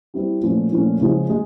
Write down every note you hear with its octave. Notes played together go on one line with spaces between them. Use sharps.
G3 C4 E4 G4
A#2 F3 A3 C#4
A#2 F3 A3 C#4
C#3 F3 G#3
G#3